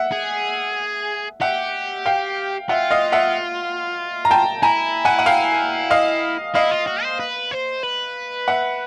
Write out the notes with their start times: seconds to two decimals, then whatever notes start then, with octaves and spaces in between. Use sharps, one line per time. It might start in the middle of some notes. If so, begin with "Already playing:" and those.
Already playing: E5 F#5
0.12 G#4
1.41 G4 E5 F#5
2.06 F5 G5
2.69 F4 E5 F#5
2.91 D#5 F5
3.12 E5 F#5
4.25 A#5
4.31 G5 A5
4.62 E4 G#5 A#5
5.05 F#5 G#5
5.19 F#5
5.26 F5 G5
5.90 D#5 F5
6.55 E4 D#5 F5
6.71 F4
6.87 F#4
7.03 C5
7.20 B4
7.51 C5
7.83 B4
8.48 E5 F#5